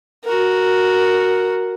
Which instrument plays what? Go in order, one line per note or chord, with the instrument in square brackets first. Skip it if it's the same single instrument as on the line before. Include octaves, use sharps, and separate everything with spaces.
[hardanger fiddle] F#4 A#4